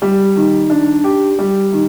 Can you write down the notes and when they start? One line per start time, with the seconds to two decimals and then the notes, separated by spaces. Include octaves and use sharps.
0.02 G3
0.36 D#3
0.70 D4
1.04 G4
1.39 G3
1.73 D#3